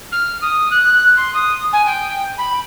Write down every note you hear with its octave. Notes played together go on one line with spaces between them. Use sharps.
F6
D#6
F#6
C6
D#6
G#5
G5
B5